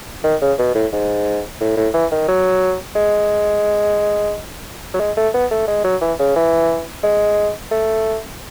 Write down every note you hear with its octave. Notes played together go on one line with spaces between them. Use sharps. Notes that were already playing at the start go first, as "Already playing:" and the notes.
D#3
C#3
B2
A2
G#2
A2
A2
E3
D#3
F#3
G#3
F#3
G#3
A3
B3
A3
G#3
F#3
E3
C#3
E3
G#3
A3